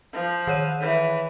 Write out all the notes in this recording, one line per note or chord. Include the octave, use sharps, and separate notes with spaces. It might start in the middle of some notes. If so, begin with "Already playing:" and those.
F3
D#3 C#5 D#7
E3